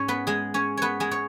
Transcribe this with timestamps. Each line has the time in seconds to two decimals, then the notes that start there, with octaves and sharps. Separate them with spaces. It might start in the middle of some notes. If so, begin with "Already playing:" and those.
Already playing: G#2 C#4 C#5
0.08 B3 B4
0.27 G#3 G#4
0.54 C#4 C#5
0.77 B3 B4 C#5
1.00 G#3 G#4
1.11 C#5